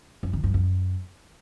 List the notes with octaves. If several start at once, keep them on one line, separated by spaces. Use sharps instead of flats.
F#2
D#3
G2
F#2